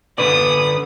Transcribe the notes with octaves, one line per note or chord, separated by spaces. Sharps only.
D3 B4 D5 D#6